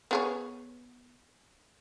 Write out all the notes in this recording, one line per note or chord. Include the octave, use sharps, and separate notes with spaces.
B3 G#4 C#5